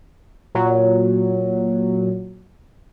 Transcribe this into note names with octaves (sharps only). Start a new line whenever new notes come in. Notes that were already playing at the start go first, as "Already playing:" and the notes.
A#2 F#3